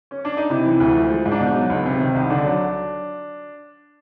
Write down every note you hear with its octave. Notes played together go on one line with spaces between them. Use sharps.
C#4
D4
D#4
C3 E4
E3
D2
F3
G#3
G#2
D4
B2 D#4
F#3
C#2
C3
D#3
C2
D3 D4
F#3